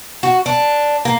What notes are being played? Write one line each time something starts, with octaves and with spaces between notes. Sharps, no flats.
F#4
D4
A#3